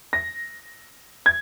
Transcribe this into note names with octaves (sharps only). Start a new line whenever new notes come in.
A#6
G#6